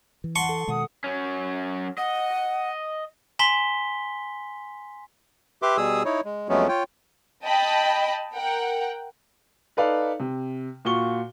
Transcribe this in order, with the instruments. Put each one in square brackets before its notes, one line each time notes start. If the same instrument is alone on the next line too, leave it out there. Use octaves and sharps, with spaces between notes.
[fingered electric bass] E3
[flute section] F#5 [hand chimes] A5 [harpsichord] C6 C#6
[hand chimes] A4
[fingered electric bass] B2 D#3 G#3 [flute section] F#5 D#6
[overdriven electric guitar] F#3 C#4
[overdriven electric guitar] D#5 [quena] F#5
[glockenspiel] G#5 A#5 C6 B6 G7
[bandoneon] G4 B4 E5 C6 D6
B2 G3 G#4 D#6 E6
D#4 E4 C#5
G#3
F2 F#3 G#3 A3 B3 C#4
F4 C#5 G5
[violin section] D#5 G5 A5 B5
A#4 F#5 G5
[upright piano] D#4 A4 B4 D5 F5
C3
A#2 F4 F#4 C#6 G7